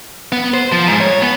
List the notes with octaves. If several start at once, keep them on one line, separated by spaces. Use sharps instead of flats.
B3
C5
F3
G#2
C#5
B3